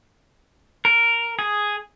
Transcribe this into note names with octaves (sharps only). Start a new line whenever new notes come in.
A#4
G#4